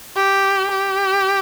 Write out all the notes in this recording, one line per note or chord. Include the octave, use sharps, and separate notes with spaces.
G4
G4